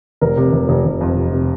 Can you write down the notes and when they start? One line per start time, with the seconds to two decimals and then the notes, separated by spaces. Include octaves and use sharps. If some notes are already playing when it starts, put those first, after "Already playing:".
0.21 F1 A#4
0.37 C3
0.53 F1
0.69 F1
0.85 F1
1.01 F2
1.17 C3
1.33 C3